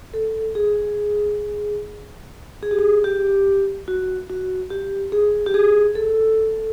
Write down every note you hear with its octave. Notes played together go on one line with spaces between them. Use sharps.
A4
G#4
G#4
G4
G#4
G4
F#4
F#4
G4
G#4
G4
G#4
A4